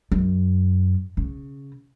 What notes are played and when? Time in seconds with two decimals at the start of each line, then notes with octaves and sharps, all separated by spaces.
0.12 F#2
1.17 C#3